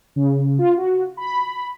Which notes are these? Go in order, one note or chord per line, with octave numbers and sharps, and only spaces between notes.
C#3
F4
F#4
B5